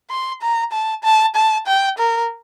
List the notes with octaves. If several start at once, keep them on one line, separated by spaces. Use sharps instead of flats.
C6
A#5
A5
A5
A5
G5
A#4